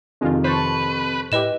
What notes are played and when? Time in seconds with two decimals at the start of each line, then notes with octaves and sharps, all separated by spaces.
0.21 F2 C3 D#3 G#3 F4
0.44 B4 C5 A5 C#6
1.32 A2 E4 G4 B4 D#5 E7